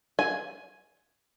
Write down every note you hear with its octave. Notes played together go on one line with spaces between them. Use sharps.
G#5